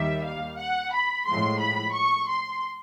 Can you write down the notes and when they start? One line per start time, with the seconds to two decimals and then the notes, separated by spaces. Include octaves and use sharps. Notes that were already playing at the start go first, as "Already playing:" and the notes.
Already playing: D#2 D#3 G3 E5
0.25 F5
0.59 F#5
0.93 B5
1.26 A2 F3 G#3 C6
1.60 B5
1.94 C#6
2.28 C6